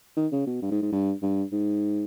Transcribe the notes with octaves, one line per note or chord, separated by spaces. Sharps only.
D#3
C#3
B2
G2
G#2
G#2
G2
G2
G#2